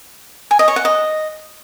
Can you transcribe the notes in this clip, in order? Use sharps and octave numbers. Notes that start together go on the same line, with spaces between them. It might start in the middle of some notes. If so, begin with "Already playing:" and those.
G#5
D#5
C#5
F#5
D#5